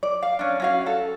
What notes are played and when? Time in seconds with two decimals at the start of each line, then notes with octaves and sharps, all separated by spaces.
0.03 D5
0.23 F5
0.39 C#4 D4
0.60 C#4 F#4 F5
0.86 A4